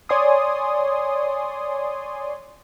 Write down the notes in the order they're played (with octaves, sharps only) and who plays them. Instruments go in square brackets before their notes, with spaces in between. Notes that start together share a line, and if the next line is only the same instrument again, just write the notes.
[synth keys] C#5 D5 G#5 C6 D#6